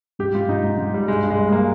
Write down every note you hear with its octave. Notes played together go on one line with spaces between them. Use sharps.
G#2 G4
G#2 F4
G#2 D#4
G#2
G#2
G3
G2 G#3
G2
G#3
G3
G#3
A#3